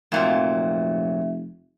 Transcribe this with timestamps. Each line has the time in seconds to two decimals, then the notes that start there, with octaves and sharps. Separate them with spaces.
0.12 F1 F2 A#2 F#3 E5